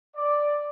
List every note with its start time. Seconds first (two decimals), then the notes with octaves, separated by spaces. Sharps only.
0.16 D5